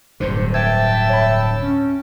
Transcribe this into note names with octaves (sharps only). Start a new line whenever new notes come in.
D1 G2 D3 C5
E5 G5 A5 E6 G#6
C#5 B5
C#4